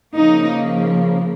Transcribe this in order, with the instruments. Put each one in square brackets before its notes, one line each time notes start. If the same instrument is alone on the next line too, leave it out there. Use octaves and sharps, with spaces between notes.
[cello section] C#3 F3 A#3 D#4